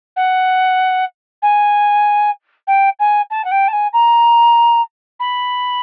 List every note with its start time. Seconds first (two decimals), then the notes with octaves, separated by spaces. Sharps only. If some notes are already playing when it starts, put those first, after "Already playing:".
0.17 F#5
1.42 G#5
2.67 G5
3.00 G#5
3.31 A5
3.45 F#5
3.51 G5
3.68 A5
3.73 G#5
3.93 A#5
5.20 B5